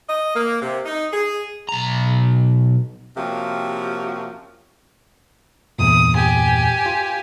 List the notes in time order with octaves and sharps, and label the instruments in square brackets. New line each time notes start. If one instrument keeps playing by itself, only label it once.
[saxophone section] D#5
A#3
C3
D#4
G#4
[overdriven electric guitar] B1 A#5
[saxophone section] C3 F3 A#3 C#4 F#4 G4
[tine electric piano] E2 G2 A#2 [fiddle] D#6
[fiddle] G4 G#5
[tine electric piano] F4